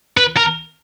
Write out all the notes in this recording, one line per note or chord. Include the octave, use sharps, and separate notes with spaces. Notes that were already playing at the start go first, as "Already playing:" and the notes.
B4
A#4